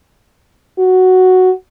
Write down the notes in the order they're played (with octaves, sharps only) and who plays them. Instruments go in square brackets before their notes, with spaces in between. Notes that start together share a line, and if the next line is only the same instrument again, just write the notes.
[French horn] F#4